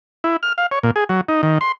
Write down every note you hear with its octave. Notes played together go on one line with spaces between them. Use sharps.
E4
F6
F5
C#5
A#2
G#4
F#3
D#4
D#3
C6